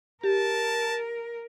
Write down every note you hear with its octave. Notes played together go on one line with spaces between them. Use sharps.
G4 A#4 A5